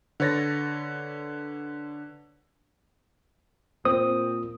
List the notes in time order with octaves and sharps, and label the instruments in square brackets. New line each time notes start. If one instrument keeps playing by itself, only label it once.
[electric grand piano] D3 B4 C#5 A6 A#6
[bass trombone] A#2 [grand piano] C4 [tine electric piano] D#6